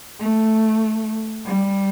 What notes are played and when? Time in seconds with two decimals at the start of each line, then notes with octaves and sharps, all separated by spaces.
0.19 A3
1.46 G3